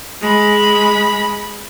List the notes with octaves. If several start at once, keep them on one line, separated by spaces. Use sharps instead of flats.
G#3 B5